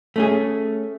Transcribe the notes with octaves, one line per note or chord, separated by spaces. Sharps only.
A3 C#4 G#4